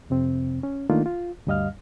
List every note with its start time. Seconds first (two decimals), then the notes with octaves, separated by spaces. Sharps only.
0.10 F2 C3 C4
0.63 C#4
0.90 D#3 A3 A#3 D4 D#4 F4
1.06 F4
1.47 D2 G2 G3 D#5 F5 F6